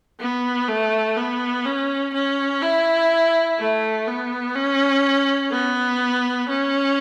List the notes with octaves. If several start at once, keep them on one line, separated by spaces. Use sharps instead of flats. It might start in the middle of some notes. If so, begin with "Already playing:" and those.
B3
A3
B3
C#4
C#4
E4
A3
B3
C#4
B3
C#4